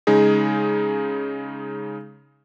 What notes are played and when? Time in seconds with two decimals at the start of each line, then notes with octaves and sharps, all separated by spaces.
0.07 C#3 G#3 D#4 G#4